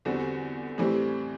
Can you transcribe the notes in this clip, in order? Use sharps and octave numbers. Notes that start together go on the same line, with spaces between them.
E2 D3 G3 C4 F#4
A2 E3 G3 C4 G4